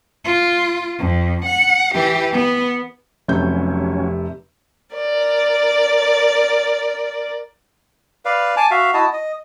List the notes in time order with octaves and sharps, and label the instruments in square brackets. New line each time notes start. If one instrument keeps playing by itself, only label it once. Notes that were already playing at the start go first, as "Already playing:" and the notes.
[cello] F4
F2
F#5
E3 G4
B3
[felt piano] F1 C3 G6 [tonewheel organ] F#3 C#4
[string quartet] A#4 D5
[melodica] B4 D5 F5
G#5 A5 D6
F#4 E5 F5
E4 F#4 D#5 A5
D#5